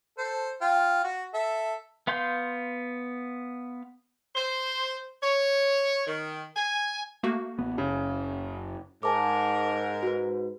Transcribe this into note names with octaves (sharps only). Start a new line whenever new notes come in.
A4 C5
F4 G5
F#4
A4 E5
B3 F5 C6 G6
C5
C#5
D#3
G#5
A3 A#3 F#4
A1 B3
F#1 C#3
G#2 A#4 G#5 A5 D6
F#4 B4